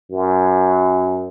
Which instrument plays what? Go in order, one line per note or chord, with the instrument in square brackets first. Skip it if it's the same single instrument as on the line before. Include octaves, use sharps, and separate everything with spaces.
[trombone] F#2